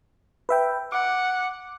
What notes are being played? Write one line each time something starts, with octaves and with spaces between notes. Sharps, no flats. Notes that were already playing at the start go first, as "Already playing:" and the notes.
B4 E5 G5
F#5 D6